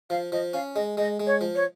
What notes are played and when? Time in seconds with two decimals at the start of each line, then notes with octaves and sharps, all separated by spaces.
0.10 F3 F5
0.32 F3 D#5
0.53 C#4 F5
0.75 G#3 D#5
0.97 G#3 D#5
1.20 G#3
1.27 C#5
1.41 F3
1.55 C#5